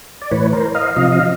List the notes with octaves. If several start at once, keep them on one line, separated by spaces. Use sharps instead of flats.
D5
A2 E3 B4 C#5
A#4 C5
D#5 F5
C3 F3 D#5 F5
D#5 F5